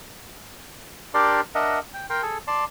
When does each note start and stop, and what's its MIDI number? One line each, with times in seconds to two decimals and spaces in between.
1.14 1.41 62
1.14 1.41 67
1.14 1.41 70
1.14 1.41 74
1.14 1.41 84
1.55 1.79 62
1.55 1.79 70
1.55 1.79 75
1.55 1.79 76
1.55 1.79 78
1.94 2.06 79
2.10 2.22 70
2.10 2.22 79
2.10 2.22 84
2.22 2.38 68
2.22 2.38 69
2.47 2.65 74
2.47 2.65 81
2.47 2.65 84